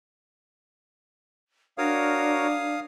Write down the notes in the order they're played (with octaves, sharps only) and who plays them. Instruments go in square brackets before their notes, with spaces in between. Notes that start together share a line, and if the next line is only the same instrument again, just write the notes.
[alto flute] D4 [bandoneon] F#4 A#4 C#5 [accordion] F5 D#6